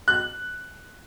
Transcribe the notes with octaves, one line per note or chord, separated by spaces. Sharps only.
F#6